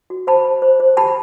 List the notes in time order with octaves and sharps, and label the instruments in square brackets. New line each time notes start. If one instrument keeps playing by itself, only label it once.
[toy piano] F#4
C5 A5 B5
C5
C5
C5
G4 A5 B5